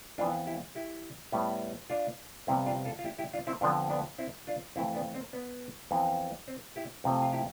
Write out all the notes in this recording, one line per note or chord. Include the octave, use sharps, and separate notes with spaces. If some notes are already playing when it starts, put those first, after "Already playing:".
F2 E3 B3 D4 F4
E4 G4
E4 G4
A2 G3 B3
D4 F4
F2 C3 G3 B3 C4 E4
D4 F4
F4 A4
F4
E4 G4
E4 G4
D4 F4
C4 E4
F2 D3 F3 B3 D4
B3 D4
C4 E4
D4 F4
F2 E3 A3 C4 E4
B3 D4
C4
B3
F2 E3 B3
C4
E4 G4
F2 C3 F3 A3
F4
E4 G4